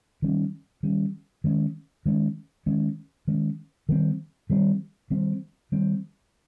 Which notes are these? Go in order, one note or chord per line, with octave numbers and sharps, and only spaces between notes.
D#3 G3 C#4
D#3 G3 C#4
D#3 G#3 C#4
D#3 G#3 C#4
D#3 G#3 C#4
D#3 G#3 C#4
D#3 G3 C4
D#3 G3 C4
D#3 G3 C4
D#3 G3 C4